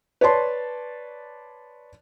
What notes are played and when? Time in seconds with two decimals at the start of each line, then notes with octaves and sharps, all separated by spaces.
0.21 B4 C#5 D5 A5 C6